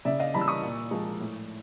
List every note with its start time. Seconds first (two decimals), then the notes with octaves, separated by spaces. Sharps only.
0.05 C#3 D5 E5
0.20 D#5 F5
0.34 E3 G3 A5 B5
0.41 E6
0.48 C#6 D#6
0.63 A#2
0.91 F3 G#3
1.20 A2